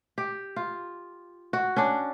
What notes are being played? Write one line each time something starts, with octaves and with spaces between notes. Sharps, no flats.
G4
F4
F#4
C#4 D4